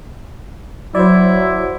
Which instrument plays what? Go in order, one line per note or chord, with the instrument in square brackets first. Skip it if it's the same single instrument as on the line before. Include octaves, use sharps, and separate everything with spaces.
[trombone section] F#3 [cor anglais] E4 [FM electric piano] C5 D5